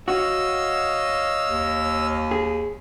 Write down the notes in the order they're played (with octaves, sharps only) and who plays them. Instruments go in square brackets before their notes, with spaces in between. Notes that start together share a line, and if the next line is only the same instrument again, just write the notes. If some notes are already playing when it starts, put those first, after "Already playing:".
[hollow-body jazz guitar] F#4 [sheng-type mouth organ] C#5 D#5 F5 [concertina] E6
[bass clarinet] D#2
[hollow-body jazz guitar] G#4